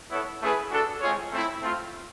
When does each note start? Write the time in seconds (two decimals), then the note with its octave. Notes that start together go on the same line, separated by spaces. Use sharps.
0.11 B3 E4 A4 C#5
0.40 A3 C#4 E4 G#4 B4
0.70 D4 F#4 A4
1.01 G#3 C4 F4 G#4 C#5
1.30 A3 C4 E4
1.61 A3 C4 F4